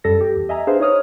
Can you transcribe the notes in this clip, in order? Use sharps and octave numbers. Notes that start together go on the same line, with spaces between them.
F#2 G3 A4 A#6
G4
E2
D#5 E5 G#5 A#5
D4 G#4 B4 C5 F5
D#4 C#5 D#6 F6